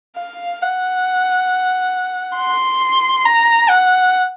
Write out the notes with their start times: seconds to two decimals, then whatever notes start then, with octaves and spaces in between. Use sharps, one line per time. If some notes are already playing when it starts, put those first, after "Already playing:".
0.17 F5
0.62 F#5
2.37 C6
3.26 A#5
3.70 F#5